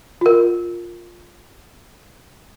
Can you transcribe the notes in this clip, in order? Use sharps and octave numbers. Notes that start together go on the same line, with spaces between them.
F4 A#4